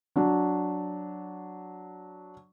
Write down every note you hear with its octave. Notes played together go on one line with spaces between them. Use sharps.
F#3 D4